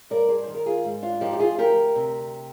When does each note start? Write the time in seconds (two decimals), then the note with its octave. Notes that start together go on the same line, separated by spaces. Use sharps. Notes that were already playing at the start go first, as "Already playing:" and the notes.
0.10 G2 A#4 D5
0.29 G#4 C5
0.43 D#3 C5
0.55 A#4
0.66 F4 G#4
0.84 G#2
1.02 D4 F4
1.21 F3 D#4 G4
1.33 G4
1.39 F4 G#4
1.58 D2 G4 A#4
1.96 C3